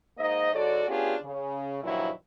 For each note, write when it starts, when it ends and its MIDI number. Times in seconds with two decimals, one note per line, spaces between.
0.18 0.51 44
0.18 0.51 58
0.18 0.51 63
0.18 0.51 72
0.18 0.51 75
0.53 0.84 44
0.53 0.84 50
0.53 0.84 66
0.53 0.84 69
0.53 0.84 73
0.53 0.84 74
0.88 1.16 59
0.88 1.16 61
0.88 1.16 62
0.88 1.16 65
0.88 1.16 67
0.88 1.16 68
1.23 1.82 49
1.83 2.09 43
1.83 2.09 46
1.83 2.09 51
1.83 2.09 53
1.83 2.09 54
1.83 2.09 64